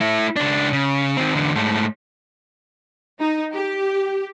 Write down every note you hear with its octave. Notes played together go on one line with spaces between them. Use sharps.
A3 E4
C#2 D4
C#3
D#3 C4
E2 D3
G#2 A3
D#4
G4